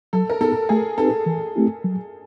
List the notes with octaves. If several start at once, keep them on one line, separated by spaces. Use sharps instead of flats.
F#3 A4
A#4
B3 D#4 G#4 A4
A3 G#4
C4 D#4 G4 A4 B4
E3
A3 C4 E4 G4
F#3